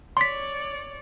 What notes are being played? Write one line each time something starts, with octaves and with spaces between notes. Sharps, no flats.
C#5 D5 C6 B6